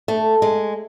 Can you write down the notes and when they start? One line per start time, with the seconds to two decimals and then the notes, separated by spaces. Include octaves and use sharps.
0.08 A3
0.42 G#3